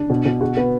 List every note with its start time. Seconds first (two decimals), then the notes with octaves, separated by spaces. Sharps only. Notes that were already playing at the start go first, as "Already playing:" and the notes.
Already playing: D4
0.10 B2
0.26 B2
0.41 F#4
0.57 B3